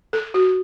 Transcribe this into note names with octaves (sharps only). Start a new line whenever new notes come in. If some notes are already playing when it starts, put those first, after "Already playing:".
A4
F#4